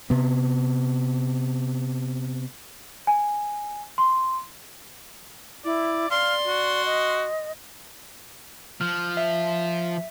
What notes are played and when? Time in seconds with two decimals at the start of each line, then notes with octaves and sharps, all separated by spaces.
0.10 C3 B3
3.07 G#5
3.98 C6
5.65 E4 D5
6.11 D5 F5 C6
6.46 F#4
6.85 D#5
8.81 F3 F6
9.17 E5